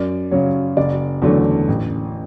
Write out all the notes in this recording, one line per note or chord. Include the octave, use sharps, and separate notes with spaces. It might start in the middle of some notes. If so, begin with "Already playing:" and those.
Already playing: F#2 D5
C#3 F#3 C#5
F#1 D5
E2 D3 F#3 A3
A1